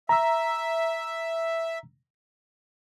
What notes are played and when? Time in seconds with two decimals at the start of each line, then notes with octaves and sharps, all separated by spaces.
0.09 E5 A#5 E6